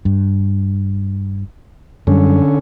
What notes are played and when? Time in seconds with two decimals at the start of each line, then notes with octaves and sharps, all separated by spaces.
0.05 G2
2.07 F#2 D3 G3 C#4